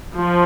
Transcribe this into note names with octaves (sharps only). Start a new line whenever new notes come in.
F3